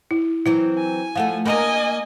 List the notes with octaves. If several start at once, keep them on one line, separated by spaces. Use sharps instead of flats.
E4
E3 F#3 C4 E4
G#5
F3 A3 A4 F5 F#5
A#3 D4 A#4 D#5 G#5